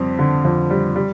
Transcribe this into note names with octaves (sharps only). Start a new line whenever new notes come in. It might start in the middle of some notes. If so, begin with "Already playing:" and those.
Already playing: F2 G3 C4
D3
F2
G3
G3